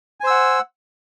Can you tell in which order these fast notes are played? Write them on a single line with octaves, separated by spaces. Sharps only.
G#5 C5 E6 F#5